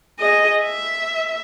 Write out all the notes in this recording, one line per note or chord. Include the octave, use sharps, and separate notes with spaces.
G#4 D#5
E5